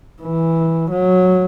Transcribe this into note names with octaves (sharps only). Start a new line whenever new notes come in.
E3
F#3